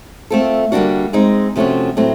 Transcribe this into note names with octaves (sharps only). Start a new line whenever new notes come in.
A3 C4 F4 A4
D3 G3 A#3 D4 F#4
G#3 C4 D#4
C3 F3 A3 C#4 F#4
A2 F#3 A3 C4